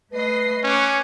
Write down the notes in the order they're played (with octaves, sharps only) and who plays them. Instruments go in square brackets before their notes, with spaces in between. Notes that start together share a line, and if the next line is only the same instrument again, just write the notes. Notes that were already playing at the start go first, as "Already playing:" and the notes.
[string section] A3 D#5 C7 [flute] B4
[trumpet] C#4 [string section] C#6 D6 F#6